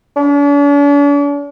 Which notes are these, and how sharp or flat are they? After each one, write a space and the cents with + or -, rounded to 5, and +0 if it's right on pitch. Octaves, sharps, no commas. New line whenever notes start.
D4 -45